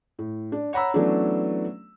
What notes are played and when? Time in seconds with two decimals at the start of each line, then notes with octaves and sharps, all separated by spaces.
0.19 A2
0.52 D4
0.73 C#5 F#5 A#5 B5 E6
0.94 E3 F#3 A3 B3 C#4 D4